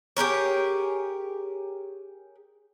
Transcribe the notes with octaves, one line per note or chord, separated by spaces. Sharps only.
G4 G#4 A#4 C#5